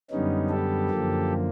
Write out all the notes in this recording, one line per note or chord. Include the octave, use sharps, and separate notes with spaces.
F#2 D3 G3 B3 C#4 D#4
G4 A4
F#2 D3 F3 A#3